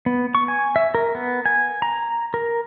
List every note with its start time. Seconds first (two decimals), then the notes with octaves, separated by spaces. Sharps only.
0.06 B3
0.35 C#6
0.48 G#5
0.76 E5
0.95 A#4
1.15 B3
1.46 G#5
1.82 A#5
2.34 A#4